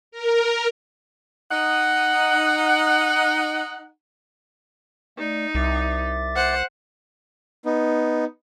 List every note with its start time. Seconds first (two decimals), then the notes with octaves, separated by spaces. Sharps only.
0.12 A#4
1.51 D#4 F#5
5.18 A3 D#4 D5
5.55 C2 E5 D6 A6
6.36 C5 F#5
7.65 B3 D#4